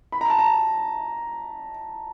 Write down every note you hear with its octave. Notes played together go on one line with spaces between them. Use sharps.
B5
A#5
A5
A#5